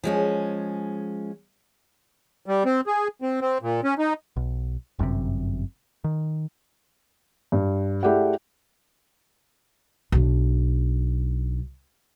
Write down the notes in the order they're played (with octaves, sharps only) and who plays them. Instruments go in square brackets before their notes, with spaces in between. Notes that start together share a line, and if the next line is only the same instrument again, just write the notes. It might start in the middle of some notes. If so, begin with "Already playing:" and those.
[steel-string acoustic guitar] F3 G#3 C#4
[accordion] G3
C4
G#4
C4
C4
A#2
C#4
D#4
[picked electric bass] B1
G1 F#2 A2 C3
D#3
[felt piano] G2
A3 E4 G4 G#4 D5 F#5
[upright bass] B1 D4